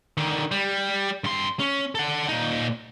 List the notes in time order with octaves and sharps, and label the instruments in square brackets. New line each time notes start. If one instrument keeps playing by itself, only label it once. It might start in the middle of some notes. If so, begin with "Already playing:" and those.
[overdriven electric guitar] D3 D#3
G3
G2 C6
C#4
A4 F#5
A#2 D#4